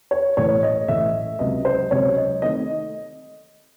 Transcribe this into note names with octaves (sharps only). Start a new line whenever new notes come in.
C#5
A1 A2 E3 A3 C#5
D#5
A1 A2 E3 A3 E5
C#2 C3 F#3 D#5
C5
C#2 C3 F#3 C#5
D#5
D#3 A3 C4 D#5